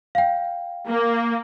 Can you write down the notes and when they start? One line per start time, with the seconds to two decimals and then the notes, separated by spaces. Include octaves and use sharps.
0.15 F5 G5
0.87 A#3